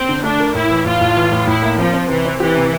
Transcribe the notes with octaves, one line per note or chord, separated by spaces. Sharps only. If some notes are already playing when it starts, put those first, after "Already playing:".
Already playing: C4
D3
A3 D4
A#4
A2 E4
E3
A2 F4
A2
E3
A2
A2 E4
A#3
F3 C4
C4
C3 E3
C4
E3 G4
C3